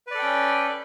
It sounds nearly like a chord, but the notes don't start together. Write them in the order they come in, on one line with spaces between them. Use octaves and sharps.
B4 D5 A4 G5 C#4